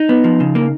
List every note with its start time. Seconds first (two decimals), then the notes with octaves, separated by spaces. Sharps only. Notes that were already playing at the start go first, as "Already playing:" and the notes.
Already playing: D#4
0.09 B3
0.24 F3
0.40 C#3
0.55 A#3